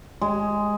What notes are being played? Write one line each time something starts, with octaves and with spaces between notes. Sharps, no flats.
G#3